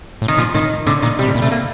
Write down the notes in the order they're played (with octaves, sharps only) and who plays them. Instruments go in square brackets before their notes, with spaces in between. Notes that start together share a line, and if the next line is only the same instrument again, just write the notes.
[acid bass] A2
[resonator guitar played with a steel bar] D#3
[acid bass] A#2 [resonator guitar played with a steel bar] F3
[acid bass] A2 [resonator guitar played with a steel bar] D#3
[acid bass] A2 [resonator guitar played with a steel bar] D3
[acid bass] A#2 [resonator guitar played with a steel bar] D#3
[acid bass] C3 [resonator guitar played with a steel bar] G3
[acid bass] A2
A#2
[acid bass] C3 [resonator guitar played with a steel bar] A3
[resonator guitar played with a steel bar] A#3